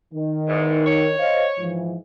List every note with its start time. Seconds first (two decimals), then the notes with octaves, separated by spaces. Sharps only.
0.14 D#3
0.49 E2 G#2
0.86 C#5
1.20 C5 D#5 F5
1.59 G#2 E3 F3